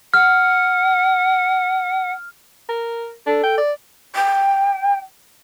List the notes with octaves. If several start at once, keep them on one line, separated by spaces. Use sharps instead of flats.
F#5 F6
A#4
D4 A4
G5
D5
G5